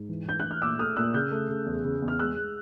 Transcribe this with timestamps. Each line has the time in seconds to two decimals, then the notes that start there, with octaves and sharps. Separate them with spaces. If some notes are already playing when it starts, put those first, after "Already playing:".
Already playing: G#2
0.09 E3
0.26 E3 G6
0.40 E3 F#6
0.51 F6
0.62 A#2 D6 E6
0.79 A3 D#6 F6
0.96 A#2 E6 F#6
1.14 C#3 F6 G6
1.31 A3
1.49 C#3
1.66 E2
1.84 C#3
2.02 E2
2.08 F6
2.19 G#3 E6 F#6
2.37 G#3